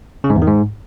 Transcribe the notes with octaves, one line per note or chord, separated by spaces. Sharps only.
C#3
G#2
E2
D#3
G#2